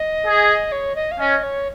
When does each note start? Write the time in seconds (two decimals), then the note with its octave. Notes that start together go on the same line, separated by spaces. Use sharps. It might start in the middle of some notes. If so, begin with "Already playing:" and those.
Already playing: D#5
0.25 G#4
0.72 C#5
0.96 D#5
1.11 F5
1.19 C#4 D#5
1.43 C#5